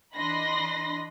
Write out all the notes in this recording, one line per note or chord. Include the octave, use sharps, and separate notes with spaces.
E3 D4 D#5 B5 C6 A#6